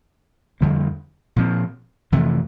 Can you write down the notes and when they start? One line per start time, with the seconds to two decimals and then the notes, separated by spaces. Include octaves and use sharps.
0.61 F2 D3 G3 A#3
1.36 A#2 F3 C4
2.12 F2 C3 E3 A3